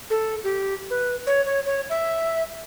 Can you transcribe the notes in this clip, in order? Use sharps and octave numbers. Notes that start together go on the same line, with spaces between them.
A4
G4
B4
C#5
C#5
C#5
E5